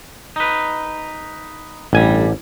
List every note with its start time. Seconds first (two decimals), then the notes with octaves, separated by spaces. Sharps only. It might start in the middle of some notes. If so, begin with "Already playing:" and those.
0.36 D#4 B4
1.93 A1 G2 G3 G#5